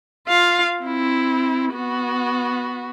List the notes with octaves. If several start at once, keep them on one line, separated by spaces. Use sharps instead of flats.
F4 F5
C4 E4
B3 F#4